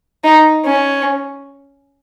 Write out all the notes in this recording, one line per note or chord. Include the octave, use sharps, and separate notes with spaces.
D#4
C#4